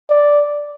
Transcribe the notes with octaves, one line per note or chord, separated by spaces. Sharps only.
D5